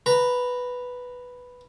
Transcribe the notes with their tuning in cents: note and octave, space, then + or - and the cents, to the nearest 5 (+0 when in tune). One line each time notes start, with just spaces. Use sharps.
B4 +0 A#5 -15